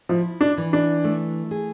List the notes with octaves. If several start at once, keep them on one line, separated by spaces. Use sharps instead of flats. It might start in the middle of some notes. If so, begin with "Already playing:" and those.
F3 E4
D4
E3
D4
A3
G#4